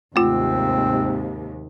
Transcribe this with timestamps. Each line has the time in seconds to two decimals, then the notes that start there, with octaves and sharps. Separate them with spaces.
0.16 D#2 G#2 C3 A3 C4 F4